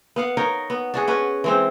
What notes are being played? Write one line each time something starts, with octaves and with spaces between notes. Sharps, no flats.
B3 F5 F#5
D#4 A#4 C#5
B3
D4 F#4 G#4
C#4 F#4 B4
E3 G#3 C4